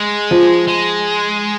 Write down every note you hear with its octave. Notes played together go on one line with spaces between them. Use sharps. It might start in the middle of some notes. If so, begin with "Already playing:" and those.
Already playing: G#3
F3
G#3